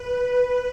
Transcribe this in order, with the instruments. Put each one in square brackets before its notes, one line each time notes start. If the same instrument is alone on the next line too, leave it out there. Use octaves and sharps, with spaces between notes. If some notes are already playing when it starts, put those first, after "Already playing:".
Already playing: [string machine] B4